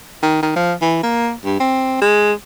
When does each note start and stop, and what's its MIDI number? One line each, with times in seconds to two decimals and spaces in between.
0.23 0.41 51
0.43 0.52 51
0.56 0.73 53
0.82 0.99 52
1.03 1.33 58
1.45 1.58 43
1.60 1.98 60
2.02 2.33 56